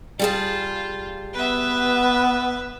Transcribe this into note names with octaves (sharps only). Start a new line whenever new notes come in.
G3 F4 G#4 A5
B3 B4 E5